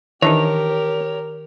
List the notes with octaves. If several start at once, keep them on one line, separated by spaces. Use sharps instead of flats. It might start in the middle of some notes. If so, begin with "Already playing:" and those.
D#3 E3 D4 D#4 G4 A#4 C#5